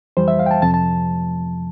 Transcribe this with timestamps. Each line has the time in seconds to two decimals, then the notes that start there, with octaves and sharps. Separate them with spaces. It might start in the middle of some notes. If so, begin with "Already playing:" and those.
0.17 F2 E3 G3 C5
0.28 E5
0.39 F5
0.46 G5
0.51 A5
0.62 F2 C3 F3 A5
0.74 A5